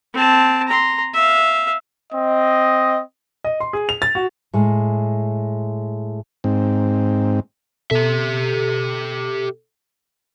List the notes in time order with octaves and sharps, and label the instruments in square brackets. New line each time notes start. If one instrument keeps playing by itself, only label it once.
[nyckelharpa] C4 A5
A#5 C6
E5 F5
[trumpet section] C4 D#5
[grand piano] D#5
C6
G#4
F7
A6
F#4
[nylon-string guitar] A2 G#3
[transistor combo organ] G#2 C4
[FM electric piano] B2 A4 [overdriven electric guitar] G4 E5